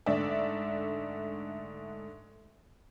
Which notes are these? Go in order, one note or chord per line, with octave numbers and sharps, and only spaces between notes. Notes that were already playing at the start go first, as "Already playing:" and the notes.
G#2 D3 A3 D5 E5